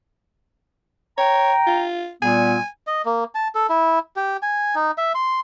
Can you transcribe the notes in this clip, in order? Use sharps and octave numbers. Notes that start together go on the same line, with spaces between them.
C#5 G5 A#5
F4
A#2 G3 B3 G#5
D#5
A#3
A5
A4
E4
G4
G#5
D#4
E5
C6